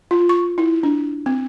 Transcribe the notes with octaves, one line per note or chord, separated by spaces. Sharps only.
F4
C#6
E4
D4
C4